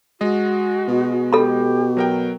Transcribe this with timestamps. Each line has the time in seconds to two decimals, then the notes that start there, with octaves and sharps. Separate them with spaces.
0.21 G#3 F#4 D#5
0.88 B2
1.33 G4 A4 B5
1.97 F#3 A#4 G5